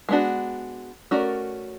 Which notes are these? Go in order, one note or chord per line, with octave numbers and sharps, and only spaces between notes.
G#3 B3 D4 F#4
A3 C#4 F#4 A#4 D5